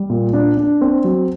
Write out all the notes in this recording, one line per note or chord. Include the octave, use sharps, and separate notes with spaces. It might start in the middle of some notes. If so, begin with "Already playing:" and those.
Already playing: G3
A#2
D4
D4
C4
F#3